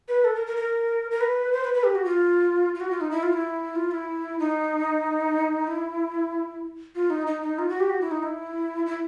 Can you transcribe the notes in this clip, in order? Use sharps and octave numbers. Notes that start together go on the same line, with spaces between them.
B4
A4
A#4
A#4
A#4
A#4
B4
C5
B4
B4
G4
F#4
F4
F4
F#4
F4
D#4
E4
F4
E4
F4
E4
D#4
E4
F4
D#4
D#4
D#4
F4
F#4
G4
F#4
E4
D#4
E4
E4